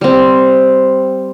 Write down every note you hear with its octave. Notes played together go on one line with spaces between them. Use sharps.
G3 C4